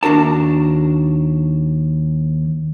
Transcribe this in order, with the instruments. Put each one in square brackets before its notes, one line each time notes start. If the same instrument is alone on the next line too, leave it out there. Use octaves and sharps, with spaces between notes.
[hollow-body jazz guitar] D#2 D4 F#4 A#4 A5